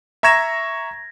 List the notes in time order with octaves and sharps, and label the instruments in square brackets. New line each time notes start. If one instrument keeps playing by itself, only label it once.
[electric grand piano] E5 A#5 C#6 G#6 A#6 E7